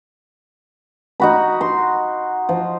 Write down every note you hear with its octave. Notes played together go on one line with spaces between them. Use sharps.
D#4 F#4 B5
C6
F3